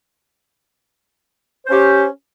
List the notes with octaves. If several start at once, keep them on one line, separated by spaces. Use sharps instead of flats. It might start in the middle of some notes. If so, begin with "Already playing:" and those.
C#4 G4 C5